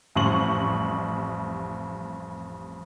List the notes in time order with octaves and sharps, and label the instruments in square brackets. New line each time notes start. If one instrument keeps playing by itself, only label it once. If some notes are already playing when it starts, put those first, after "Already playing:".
[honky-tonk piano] A1 F2 G3 C6 C#6 F#7